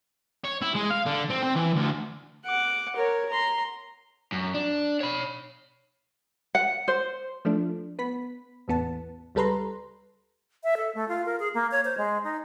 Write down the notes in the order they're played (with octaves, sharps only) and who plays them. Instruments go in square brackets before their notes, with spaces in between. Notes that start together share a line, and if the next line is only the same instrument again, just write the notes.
[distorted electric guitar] C#5
E4
G#3
F5
D3
C4
C4
E3
D2
[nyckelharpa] F#5 D6
A#4 C#5
A#5 C6
[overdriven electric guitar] F#2
D4
C#5 B5
[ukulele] F#5
C5
[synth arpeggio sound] F3 A3 D4
B3 B5 B6
A1 E2 B3 A5
C#2 G3 A4 B4 A#5 C6
[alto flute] E5
A4
A3
F4
A#4
G#4
A#3
C#5
C5
G#3
D#4